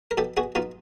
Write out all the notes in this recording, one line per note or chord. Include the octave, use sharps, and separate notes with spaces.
A#4
B2 G4 A4
B2 F#4 G#4
B2 D#4 F4